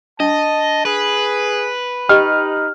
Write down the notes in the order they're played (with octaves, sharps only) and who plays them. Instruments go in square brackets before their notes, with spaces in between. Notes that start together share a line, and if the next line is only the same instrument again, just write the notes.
[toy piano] D4 [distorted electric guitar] D#5 [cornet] A5
[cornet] G#4 [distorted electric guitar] B4
[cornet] D#4 [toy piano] G4 D#5 G5 [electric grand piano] F6